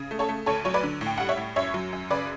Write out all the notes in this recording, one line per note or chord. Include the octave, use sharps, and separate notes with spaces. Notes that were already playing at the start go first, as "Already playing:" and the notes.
Already playing: C#3
A3
A4 C#5
A3
D2 A4 C#5
F#3 C#5
B4 D5
D3
A2
G5
G3 F#5
C#5 E5
A2
F#2 C#5 E5
F#3
F#2
C#3 B4 D5